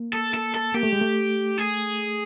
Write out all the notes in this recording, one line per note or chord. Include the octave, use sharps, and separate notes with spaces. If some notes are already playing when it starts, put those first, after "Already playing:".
Already playing: A#3
A4
A4
A4
A#3 G4
A3
G#3
A3
G#4